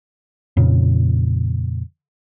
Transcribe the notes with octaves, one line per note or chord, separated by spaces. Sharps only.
F2 A#2 C#3